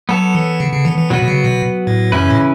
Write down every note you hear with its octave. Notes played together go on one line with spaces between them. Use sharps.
F#3 B3 A4 C#5
E3
C#3
C#3
E3
E3
B2 F#3 B3 F#4 B4
B2
C#3
B2
A2
F#2 C#3 E3 C#4 E4 B4
A2